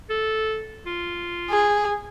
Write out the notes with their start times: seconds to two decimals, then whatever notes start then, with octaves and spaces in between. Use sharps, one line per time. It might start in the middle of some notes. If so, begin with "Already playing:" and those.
0.10 A4
0.86 F4
1.50 G#4